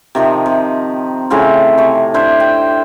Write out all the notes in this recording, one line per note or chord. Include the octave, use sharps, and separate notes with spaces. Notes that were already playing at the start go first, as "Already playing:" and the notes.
C3 D#3 F3
C3
A2 C#3 C4 F4
C3 C#6
D4 E4 C5
G5